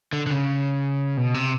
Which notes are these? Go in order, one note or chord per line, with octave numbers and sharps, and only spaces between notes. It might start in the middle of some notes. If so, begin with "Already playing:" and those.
D3
D3
C#3
B2
C3